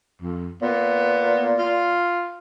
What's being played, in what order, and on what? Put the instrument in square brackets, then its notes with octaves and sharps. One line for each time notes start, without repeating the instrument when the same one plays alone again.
[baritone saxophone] F2
[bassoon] A#2 [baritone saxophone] B3
[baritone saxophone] F4